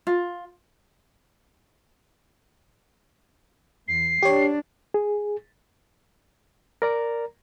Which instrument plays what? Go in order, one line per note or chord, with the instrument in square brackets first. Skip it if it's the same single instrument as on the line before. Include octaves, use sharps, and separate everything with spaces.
[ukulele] F4
[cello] E2 [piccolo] C7
[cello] D4 [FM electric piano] G4 C#5
[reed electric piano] G#4
A#4 D5 A#5